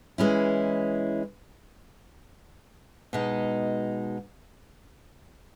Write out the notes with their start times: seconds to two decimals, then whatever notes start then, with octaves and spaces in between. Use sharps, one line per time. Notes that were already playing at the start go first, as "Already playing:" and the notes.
0.18 E3 G#3 C#4 E4
3.13 B2 G#3 D#4